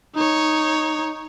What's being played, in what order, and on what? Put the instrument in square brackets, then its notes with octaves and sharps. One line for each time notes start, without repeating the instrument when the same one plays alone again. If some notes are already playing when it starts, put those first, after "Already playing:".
[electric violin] D#4 C#5